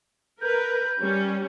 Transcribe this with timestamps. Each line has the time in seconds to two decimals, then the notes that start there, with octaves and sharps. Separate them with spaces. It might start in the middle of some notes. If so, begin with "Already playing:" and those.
0.41 A#4 B4 G6
1.00 G3 C#4